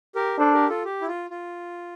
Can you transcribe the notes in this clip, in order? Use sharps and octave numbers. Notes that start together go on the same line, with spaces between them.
G4 A#4
D4 A4 C5
G4 A#4
F4 A4
G4
E4
F4
F4